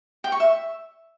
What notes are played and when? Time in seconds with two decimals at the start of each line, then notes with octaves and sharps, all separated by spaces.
0.24 G5
0.32 C#6
0.40 E5